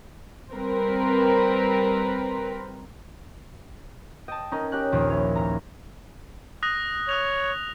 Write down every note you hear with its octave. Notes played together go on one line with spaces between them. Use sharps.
G3 C4 A#4 B4
D#5 G5 A5
C#4 D#4 A#4
C#4 G4 F#6
A#1 D#2 F4
E4 C#5
A#2 A#5
D#6 F#6 A#6
C#5 D#6 F#6 F7